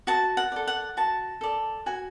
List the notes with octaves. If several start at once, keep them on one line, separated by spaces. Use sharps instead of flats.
F#4 A5
F#5
A4 D5
F#5
F#4 A5
A4 D5
F#4 G#5